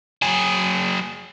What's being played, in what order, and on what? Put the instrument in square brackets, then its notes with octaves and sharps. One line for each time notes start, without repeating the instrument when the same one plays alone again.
[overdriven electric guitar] F#3 G#4